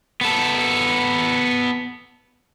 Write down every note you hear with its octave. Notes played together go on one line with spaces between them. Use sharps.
B3 A4